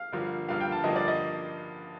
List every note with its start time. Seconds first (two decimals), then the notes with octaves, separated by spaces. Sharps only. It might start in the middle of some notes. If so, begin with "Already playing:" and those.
Already playing: F5
0.12 G2 D3 F3 A#3
0.49 G2 D3 F3 A#3 F5
0.61 G5
0.72 A5
0.84 G2 D3 F3 A#3 D#5
0.96 D5
1.08 D#5